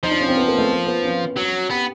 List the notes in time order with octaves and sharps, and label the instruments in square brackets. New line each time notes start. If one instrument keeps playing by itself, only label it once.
[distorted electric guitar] F3 [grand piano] D#4
[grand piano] D4
C#4
C4
B3
A#3
A3
A#3
B3
C#4
[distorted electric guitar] F#3
[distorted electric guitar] B3 [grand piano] G4